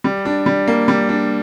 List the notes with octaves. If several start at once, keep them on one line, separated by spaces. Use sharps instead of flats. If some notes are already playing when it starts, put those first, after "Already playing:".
G3
D4
G3
A#3
G3
D4